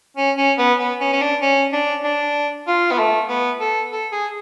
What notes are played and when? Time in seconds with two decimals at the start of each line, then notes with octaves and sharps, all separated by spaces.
0.17 C#4
0.38 C#4
0.58 B3
0.79 B3
1.00 C#4
1.13 C#4
1.21 D4
1.42 C#4
1.73 D4
2.04 D4
2.68 F4
2.91 B3
2.99 A3
3.29 B3
3.60 A4
3.92 A4
4.12 G#4